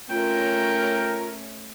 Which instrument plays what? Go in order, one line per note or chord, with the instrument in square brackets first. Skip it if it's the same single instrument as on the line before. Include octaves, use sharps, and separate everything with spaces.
[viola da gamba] A3 C#4 C#5 [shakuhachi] F4 [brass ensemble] A#4 [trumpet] G5